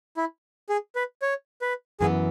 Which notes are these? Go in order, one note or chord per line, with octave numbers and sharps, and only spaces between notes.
E4
G#4
B4
C#5
B4
F#2 E3 B3 G#4